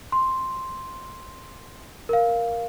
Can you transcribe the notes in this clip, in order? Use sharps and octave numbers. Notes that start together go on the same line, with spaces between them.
C6
A#4 F5